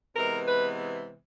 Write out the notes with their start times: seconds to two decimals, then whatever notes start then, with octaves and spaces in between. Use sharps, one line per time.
0.16 C3 E3 G#3 B3 A#4
0.46 B4